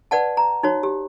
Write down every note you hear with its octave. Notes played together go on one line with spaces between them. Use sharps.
B4 D5 F#5 A5
A#5
D#4 F#4 C#5
G4